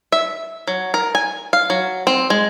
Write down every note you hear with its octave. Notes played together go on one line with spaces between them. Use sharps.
E5
F#3
A#4
G#5
F5
F#3
C4
G#3